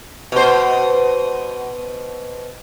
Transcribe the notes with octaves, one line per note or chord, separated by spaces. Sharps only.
B2 C5